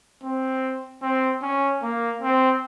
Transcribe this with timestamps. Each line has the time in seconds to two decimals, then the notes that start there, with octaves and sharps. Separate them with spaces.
0.24 C4
1.02 C4
1.42 C#4
1.83 A#3
2.22 C4